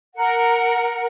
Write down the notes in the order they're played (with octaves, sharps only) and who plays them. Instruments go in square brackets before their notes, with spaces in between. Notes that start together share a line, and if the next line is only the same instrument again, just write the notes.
[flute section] A#4 F#5